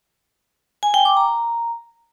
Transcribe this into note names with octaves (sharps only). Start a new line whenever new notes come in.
G#5
G5
D6
A#5